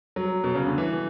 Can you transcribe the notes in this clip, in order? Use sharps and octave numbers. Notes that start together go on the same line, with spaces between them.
F#3
B2
C#3
D3
E3